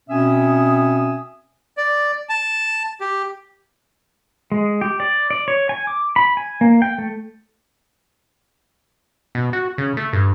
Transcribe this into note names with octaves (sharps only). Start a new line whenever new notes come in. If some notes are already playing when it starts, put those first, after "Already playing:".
B2 C4 C#4 E5 G#5 D#6
D5
A5
G4
G#3
G4
D5
D5
C#5
G#5
D6
B5
G#5
A#3
G5
A3
B2
F#4
C#3
A3
G2